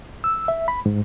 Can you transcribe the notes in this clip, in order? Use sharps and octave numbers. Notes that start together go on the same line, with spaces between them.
E6
E5
B5
G#2